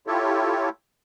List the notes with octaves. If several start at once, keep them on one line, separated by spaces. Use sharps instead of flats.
E4 F4 G4 A4 C#5